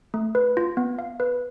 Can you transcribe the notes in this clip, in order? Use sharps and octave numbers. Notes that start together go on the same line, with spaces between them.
A3
B4
F4
B3
F5
B4